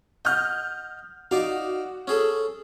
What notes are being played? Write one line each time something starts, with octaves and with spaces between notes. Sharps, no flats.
D#5 F#5 F6 G6
D#4 F#4 D5 F5
C#4 G#4 A4